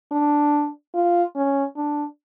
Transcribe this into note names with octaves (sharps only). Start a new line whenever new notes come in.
D4
F4
C#4
D4